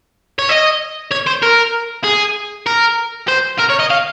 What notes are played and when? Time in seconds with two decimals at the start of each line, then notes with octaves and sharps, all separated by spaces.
0.39 C#5
0.49 D#5
1.11 C#5
1.26 C5
1.42 A#4
2.04 G#4
2.66 A#4
3.28 C5
3.59 A#4
3.69 C#5
3.79 D#5
3.90 F5